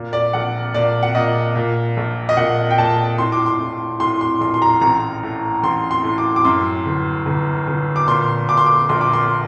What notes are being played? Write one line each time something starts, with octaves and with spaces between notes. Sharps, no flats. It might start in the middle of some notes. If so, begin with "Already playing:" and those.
Already playing: A#2
D5
A#1 F#5
A#2 D5
F#5
A#2 D#5
A#2
A#1
D#5
A#2 F#5
G5
A#2 A5
A2 C6
D6
C6
A2
A2 C6
C6
A#1 C6
C6
A#5
A1 A#5
A2
A1 C6
C6
A2
D6
D6
F#2 C6
G1
G1
G1
D6
A#2 C6
A#2 D6
C6
D6
A#1 C6
D6
C6